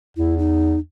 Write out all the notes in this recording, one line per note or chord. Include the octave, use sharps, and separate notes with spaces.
E2 E4
D#4